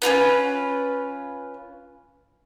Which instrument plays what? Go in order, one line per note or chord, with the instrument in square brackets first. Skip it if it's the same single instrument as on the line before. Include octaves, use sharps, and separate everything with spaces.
[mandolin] C#4 D#4 F4 B4